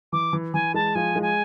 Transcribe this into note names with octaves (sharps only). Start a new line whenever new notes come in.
E3 D6
E3
E3 G#5
G#3 A5
F3 G#5
G#3
G#5